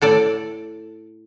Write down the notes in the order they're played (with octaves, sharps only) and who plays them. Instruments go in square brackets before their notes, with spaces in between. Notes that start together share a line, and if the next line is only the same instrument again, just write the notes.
[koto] A2 A4 D5